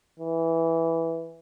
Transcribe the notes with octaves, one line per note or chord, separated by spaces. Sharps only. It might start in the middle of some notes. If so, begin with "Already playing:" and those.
E3